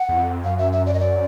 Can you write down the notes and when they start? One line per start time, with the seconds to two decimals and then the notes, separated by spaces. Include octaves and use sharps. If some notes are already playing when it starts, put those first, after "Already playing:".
Already playing: F#5
0.08 E2
0.16 F2
0.44 F#2 F5
0.58 E5
0.73 E5
0.86 D5
0.94 D#5
0.99 D5